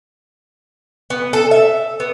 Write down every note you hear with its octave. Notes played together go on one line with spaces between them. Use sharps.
B3
A4
E5
B3